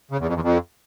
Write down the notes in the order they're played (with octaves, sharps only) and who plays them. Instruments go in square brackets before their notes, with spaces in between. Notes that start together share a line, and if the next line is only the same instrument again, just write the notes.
[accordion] C#3
E2
F2
E2
F2